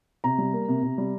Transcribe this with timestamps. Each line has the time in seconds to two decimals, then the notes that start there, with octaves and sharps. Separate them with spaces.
0.24 C3 A#5
0.38 G3
0.53 A#3
0.68 C3
0.83 C3
0.98 G3